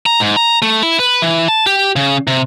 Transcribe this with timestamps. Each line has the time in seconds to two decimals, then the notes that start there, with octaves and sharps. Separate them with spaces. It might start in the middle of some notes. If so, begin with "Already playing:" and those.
0.06 A#5
0.20 G#2
0.36 A#5
0.62 A3
0.83 E4
0.99 B4
1.22 E3
1.48 A5
1.67 G4
1.96 C#3
2.27 C3